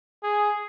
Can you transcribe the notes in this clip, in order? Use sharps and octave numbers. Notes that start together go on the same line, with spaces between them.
G#4